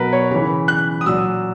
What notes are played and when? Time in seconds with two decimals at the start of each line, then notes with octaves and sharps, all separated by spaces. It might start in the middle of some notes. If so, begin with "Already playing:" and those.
Already playing: B2 F#3 A#4 B4
0.13 C#5
0.31 C#3 E3 B5
0.68 F#6
1.01 D#6
1.06 A#2 F#3 E6